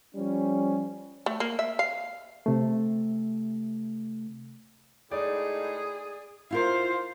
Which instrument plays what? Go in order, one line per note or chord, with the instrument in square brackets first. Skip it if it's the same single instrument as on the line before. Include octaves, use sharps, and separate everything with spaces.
[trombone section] F3 G3 C#4
[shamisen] A3
A#3
E5
F5
[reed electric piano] C3 A3
[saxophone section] A2 G#3 D#4 [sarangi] G#4 [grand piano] D5
[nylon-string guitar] E4 F4 A#4 [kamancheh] C5 F5